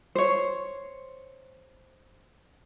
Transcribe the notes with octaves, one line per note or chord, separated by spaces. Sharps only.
C5 C#5